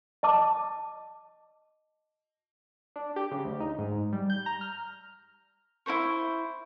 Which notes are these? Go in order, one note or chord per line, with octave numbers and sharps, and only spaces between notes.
D#5 A5 D6
D4
G4
C#3
D2
D#4
G#2
G3
G6
A#5
F6
E4 A4 C5 C#6